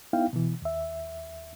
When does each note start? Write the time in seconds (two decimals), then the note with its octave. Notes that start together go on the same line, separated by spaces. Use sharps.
0.13 B3 D#4 E4 F5 G5
0.33 B2 E3
0.62 D#2 E5